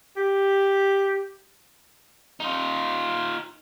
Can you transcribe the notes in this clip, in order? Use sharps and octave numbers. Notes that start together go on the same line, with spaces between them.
G4
D#4 F4